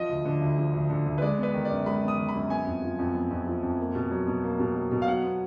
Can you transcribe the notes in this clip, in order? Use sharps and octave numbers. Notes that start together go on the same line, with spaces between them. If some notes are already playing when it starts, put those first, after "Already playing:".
Already playing: F3 D#5
D2
D3
D2
F3
D2
D3
D2
B4
G#3 D5
B3
B4
D#3
D5
F#2
G#3 B5
B3
D#6
D#3
B5
F#2
B3 G#5
F2
F3
F2
B3
F2
F3
F2
A#3
B2
F#3
B2
A#3
B2
F#3
B2
F5
F#3 F#5
B3